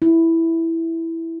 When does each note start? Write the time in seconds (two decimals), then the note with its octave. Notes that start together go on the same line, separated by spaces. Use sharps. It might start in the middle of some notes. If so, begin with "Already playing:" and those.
0.02 E4